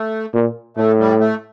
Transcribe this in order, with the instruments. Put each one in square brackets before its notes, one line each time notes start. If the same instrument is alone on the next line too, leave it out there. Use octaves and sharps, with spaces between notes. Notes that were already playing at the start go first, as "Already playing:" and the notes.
Already playing: [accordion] A3
[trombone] A#2
[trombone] A2 [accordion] A3
[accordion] G3
A3